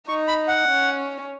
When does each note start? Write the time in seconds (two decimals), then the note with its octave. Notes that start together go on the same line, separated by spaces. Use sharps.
0.08 D#4 C#6
0.28 B5
0.48 F#5
0.69 C#4